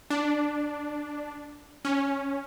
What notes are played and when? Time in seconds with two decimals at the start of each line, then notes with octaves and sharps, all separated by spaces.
0.10 D4
1.85 C#4